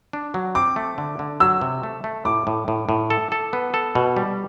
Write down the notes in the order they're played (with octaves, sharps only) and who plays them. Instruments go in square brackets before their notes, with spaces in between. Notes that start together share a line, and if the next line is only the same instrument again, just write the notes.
[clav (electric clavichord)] D4
F#3
[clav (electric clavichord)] C4 [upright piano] D6
[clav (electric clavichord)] A3
D3
D3
[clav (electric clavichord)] F#3 [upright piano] E6
[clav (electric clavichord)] C3
A3
A3
[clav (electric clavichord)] A2 [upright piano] D6
[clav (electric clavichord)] A2
A2
A2
A4
A4
B3
A4
B2
G3